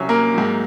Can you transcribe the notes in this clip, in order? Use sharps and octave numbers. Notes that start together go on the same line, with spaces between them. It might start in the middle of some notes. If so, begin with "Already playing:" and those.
Already playing: C2 C3 F#3 C#4 C#5
A#3 A#4
G#2 F#3